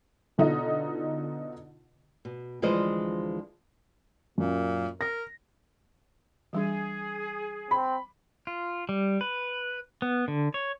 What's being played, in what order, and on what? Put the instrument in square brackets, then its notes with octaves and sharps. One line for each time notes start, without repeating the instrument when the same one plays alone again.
[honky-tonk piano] B2 D3 D#4 F4 D#5
[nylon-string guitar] B2
D2 E3 F3 G#3 C5 D#5
[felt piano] F#2 [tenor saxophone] A#2
[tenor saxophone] A#4 [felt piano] A#6
[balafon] E3 G3 D4 [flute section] G#4
[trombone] C4 [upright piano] B5
[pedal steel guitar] F4
G3
B4
B3
D3
C#5